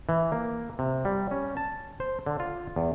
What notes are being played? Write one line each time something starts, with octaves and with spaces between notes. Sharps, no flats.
E3
A#3
C3
G3
C#4
A5
C5
D3
F4
E2